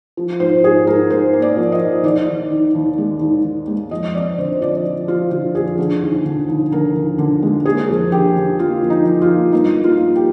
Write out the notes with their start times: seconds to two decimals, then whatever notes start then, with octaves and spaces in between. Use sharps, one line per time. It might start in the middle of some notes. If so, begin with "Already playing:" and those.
0.17 F3
0.40 G#2 C5
0.64 G#2 G#4
0.87 G#2 A#4
1.10 G#2 C5
1.33 A#3
1.42 D5
1.57 F3
1.72 D#5
1.80 F3
2.03 D#2 D5
2.27 D#2
2.50 D#3
2.75 D#2
2.98 G#3
3.21 D#2
3.44 D#3
3.67 G#3
3.91 F2 D#5
4.15 C4 D5
4.38 D3 C5
4.61 F3 D5
4.85 F3
5.08 F3 F4
5.31 D3 F4
5.54 F2 G#4
5.78 D3
6.02 D#2
6.25 D3
6.48 D#2
6.71 D3 A#4
6.95 D#2
7.18 D3
7.42 G#3
7.65 A#3 G#4
7.89 F2
8.12 D3 G4
8.36 D3
8.59 A#3 F4
8.82 F2
8.90 D#4
9.05 F2
9.22 F4
9.30 A#3
9.52 G2 D#4
9.75 A#3
9.84 F4
9.99 A#3
10.16 G4